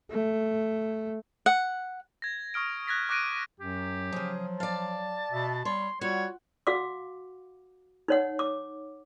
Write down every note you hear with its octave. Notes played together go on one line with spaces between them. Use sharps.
A3
F#5
G#6 A#6
C#6 D#6 F6 D7
F#6 G#6 A#6 B6
C#6 D6 F#6 A#6 D7 D#7
F#2 F#3 G4
C#3 F3 G#4
D5 F5 A5
B2 E5
G3 C#5 C6
G3 F4 F#4 C#5
F#4 F5 F#5 D6
D#4 C#5 F#5
D6